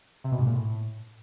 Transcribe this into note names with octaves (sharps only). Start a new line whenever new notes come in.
C3
B2
G#2
A#2
A2